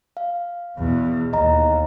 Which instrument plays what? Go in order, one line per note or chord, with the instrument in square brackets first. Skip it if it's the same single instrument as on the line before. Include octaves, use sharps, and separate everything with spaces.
[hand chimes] F5
[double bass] E2 B2
[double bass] D#2 [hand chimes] D#5 A#5